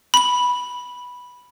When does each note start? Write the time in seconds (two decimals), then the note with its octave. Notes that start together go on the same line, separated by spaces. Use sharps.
0.14 B5 F#7